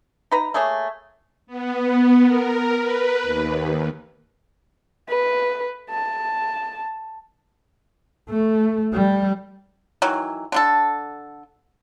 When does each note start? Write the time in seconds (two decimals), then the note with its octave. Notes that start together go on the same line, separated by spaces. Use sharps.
0.32 D#4 B4 A#5
0.54 A3 A#3 G#4 C#5
1.47 B3
2.25 A#4
2.76 B4
3.23 D#2
5.09 B4
5.90 A5
8.29 A3
8.93 G3
10.02 D#3 E3 F#3
10.52 D3 D4 A4